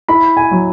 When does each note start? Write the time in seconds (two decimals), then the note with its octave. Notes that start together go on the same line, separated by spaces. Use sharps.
0.09 E4 B5
0.37 G#5
0.51 F#3